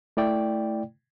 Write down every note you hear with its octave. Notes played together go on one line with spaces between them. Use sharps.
A3 E4 D5 G5